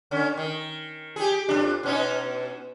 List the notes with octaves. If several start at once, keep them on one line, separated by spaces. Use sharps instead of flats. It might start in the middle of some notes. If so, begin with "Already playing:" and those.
D3 C#4
D#3
G4 G#4
F2 F#3 D4
B2 C#4 D#4